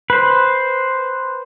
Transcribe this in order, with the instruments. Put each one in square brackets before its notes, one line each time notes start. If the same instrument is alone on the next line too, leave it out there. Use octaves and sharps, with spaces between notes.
[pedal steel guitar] B4 C5